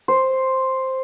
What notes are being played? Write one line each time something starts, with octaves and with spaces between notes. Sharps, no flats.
C5